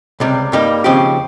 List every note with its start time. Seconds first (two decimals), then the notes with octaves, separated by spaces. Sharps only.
0.20 C#2 C3 G3
0.52 G2 G3 A#3 D#4
0.84 D#2 C#3 F3 C4 G4